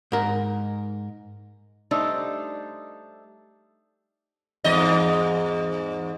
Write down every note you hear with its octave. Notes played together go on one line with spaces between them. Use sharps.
G#2 A#4
G3 A3 D4 D#4 C5
E2 G#2 D#5